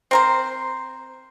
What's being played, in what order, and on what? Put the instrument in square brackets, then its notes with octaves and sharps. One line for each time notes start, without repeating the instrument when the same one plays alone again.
[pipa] C4 A#4 C5